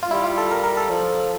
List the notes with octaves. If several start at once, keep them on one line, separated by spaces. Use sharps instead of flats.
F4
G3 E4
F4
A4
A#4
A#4
A4
F3